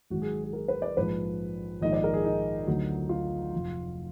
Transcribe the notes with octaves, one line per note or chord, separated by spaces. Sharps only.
G#1 G#2 F#3 F#4
G#4
G#4
A#4
B4
D5
A#1 G#2 F3 B4
A#1 G#2 D#3 D#5
D5
A#4
G#4
D#4
D2 D3 F#3
F4
F1 F2 F3